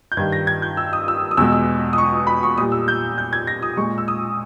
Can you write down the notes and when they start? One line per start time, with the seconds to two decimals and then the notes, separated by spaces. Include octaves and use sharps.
0.12 G6
0.17 G2 D#3 G3 G#6
0.32 A#6
0.47 G#6
0.62 G6
0.77 E6
0.93 D#6
1.08 E6
1.31 D#6
1.37 E2 E6
1.40 B2 G#3
1.53 E6
1.93 D#6
1.98 C#6
2.27 B5
2.43 C#6
2.58 A#2 G3 D#6
2.72 E6
2.88 G6
3.18 G6
3.33 G#6
3.47 A#6
3.63 D#6
3.77 A#2 G#3 C#6
3.98 E6
4.08 D#6